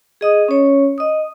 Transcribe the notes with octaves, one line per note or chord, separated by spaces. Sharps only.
G#4 D#5 D#6
C#4 C#5
D#5 D#6